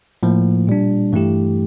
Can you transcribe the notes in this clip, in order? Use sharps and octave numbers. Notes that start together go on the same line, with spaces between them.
A2 F3 A#3
A#2 G3 D4
G2 E3 A3 E4 G4